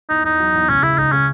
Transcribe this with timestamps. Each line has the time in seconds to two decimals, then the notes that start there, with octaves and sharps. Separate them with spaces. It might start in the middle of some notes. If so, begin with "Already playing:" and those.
0.09 E2 D#4
0.24 E2 D#4
0.39 F#3
0.54 E2
0.69 C#2 C#4
0.83 C#3 E4
0.97 C#2 D#4
1.12 C#3 C#4